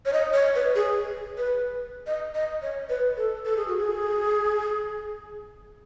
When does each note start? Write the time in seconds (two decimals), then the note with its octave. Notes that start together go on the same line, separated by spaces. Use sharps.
0.06 C#5
0.13 D#5
0.33 C#5
0.55 B4
0.75 G#4
1.38 B4
2.07 D#5
2.35 D#5
2.62 C#5
2.89 B4
3.17 A4
3.45 A4
3.57 G#4
3.67 F#4
3.77 G#4